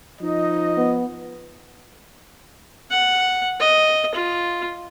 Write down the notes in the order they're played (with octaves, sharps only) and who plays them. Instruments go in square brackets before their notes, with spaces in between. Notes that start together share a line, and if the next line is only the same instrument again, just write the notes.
[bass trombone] F3 [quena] D#4 [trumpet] D#5
[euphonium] B3
[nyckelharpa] F#5
D#5
F4